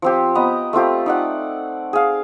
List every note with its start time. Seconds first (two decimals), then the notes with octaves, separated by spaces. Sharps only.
0.02 F3 C4 G4
0.35 B3 D#5 A#5
0.73 A3 C4 F4 G4
1.06 D#4 D5 F#5
1.93 G#4 F5